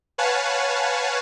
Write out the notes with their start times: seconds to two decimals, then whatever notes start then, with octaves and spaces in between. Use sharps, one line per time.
0.18 B4 C#5 F5 F#5 G#5 A5